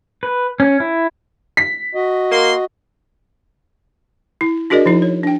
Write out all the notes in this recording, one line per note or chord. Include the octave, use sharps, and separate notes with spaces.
B4
C#4
E4
B6
F#4 D#5
A#3 C6
E4
D4 F#4 G#4 A#4 D5 D#5
F3 D#4 E4
C#5
D4 G5